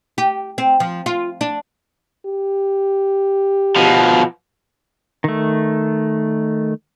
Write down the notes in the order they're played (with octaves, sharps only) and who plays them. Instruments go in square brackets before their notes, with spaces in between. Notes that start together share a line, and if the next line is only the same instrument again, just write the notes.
[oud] G4
C4
F3
F4
D4
[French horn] G4
[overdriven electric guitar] B2 F3
[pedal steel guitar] D#3 A3